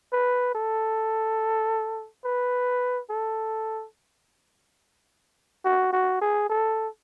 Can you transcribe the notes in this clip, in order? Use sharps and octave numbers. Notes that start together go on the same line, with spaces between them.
B4
A4
B4
A4
F#4
F#4
G#4
A4